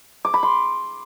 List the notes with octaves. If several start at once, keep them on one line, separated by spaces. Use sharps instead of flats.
D6
B5
C6